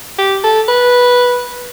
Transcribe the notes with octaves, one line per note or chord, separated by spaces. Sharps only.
G4
A4
B4